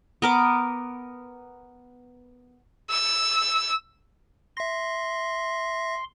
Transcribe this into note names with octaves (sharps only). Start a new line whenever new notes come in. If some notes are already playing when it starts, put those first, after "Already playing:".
B3 A#4 D6
E6
E5 C6 A#6